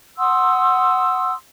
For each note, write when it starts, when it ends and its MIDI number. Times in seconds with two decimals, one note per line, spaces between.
0.17 1.33 78
0.17 1.33 84
0.17 1.33 87
0.17 1.33 88